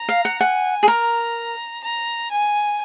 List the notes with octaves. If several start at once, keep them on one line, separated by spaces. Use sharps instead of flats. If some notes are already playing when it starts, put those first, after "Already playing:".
Already playing: A#5
F5
F#5
F#5 G#5
G#4
A#4 A#5
A#5
G#5